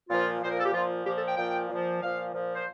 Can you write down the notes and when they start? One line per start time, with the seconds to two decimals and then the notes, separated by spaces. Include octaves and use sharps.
0.09 A#2 F3 F4
0.41 A#2 F3 C5
0.50 A#4
0.57 A4
0.65 G4
0.73 A#2 F3 F4
1.04 A#2 G4
1.07 F3
1.16 A4
1.26 G5
1.37 A#2 F3 G5
1.69 A#2 F3
2.00 A#2 F3 F5
2.33 A#2 F3
2.54 C5